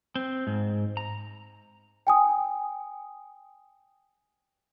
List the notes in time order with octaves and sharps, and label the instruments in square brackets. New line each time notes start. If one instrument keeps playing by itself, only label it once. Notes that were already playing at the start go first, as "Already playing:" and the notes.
[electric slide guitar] C4
G#2
A#5
[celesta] G5 G#5 D#6